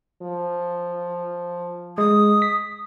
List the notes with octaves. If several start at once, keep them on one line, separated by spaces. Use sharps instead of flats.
F3
G#3 D#6
B6